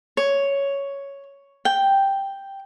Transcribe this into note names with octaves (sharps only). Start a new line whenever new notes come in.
C#5
G5